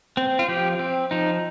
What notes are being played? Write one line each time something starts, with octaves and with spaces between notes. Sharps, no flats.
C4
F4
F3 G4
C4
F3 D#4